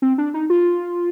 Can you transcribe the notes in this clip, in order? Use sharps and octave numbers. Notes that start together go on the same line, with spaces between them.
C4
D4
D#4
F4